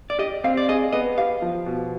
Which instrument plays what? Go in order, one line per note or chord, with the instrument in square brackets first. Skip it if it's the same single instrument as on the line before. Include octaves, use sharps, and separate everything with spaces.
[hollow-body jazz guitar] D5
[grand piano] G4 [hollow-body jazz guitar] D#5
[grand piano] C4 [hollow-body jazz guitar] F5
[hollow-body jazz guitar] D5
[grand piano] G#4 [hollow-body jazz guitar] D#5
[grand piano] B3 [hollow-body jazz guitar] D#5
[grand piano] G4 [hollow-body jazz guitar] F5
[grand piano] F3
B2